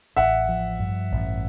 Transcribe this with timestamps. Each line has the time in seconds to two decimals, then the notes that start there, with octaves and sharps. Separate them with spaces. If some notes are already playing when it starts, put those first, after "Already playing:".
0.16 A1 E5 F#5
0.49 F3
0.80 G2
1.12 A1